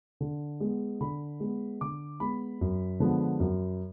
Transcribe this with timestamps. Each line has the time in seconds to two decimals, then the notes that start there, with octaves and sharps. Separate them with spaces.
0.20 D3
0.60 G#3 B3
1.01 D3 B5
1.40 G#3 B3
1.81 D3 D6
2.20 G#3 B3 B5
2.61 F#2
3.00 D3 F3 G#3 B3
3.40 F#2